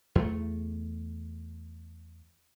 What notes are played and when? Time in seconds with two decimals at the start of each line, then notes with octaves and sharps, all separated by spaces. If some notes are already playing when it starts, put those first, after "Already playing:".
0.15 E2 A3